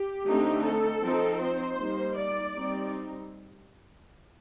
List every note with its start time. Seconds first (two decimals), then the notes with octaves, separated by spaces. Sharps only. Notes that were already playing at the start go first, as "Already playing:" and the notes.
Already playing: G4
0.25 D3 A3 C4 D#4
0.64 A4
1.02 F3 C4 D#4
1.41 C5
1.79 G3 A#3 D#4
2.17 D5
2.55 G3 C4 D#4